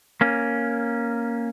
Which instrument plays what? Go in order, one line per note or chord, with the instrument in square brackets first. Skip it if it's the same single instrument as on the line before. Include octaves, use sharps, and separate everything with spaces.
[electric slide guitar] A#3 C#4